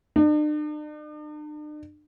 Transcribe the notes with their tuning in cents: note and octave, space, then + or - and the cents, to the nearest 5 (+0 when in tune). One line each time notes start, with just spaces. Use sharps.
D4 +45